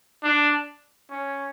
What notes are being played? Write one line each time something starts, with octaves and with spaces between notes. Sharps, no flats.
D4
C#4